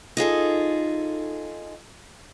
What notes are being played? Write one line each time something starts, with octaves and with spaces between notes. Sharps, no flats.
D#4 F4 G#4 A4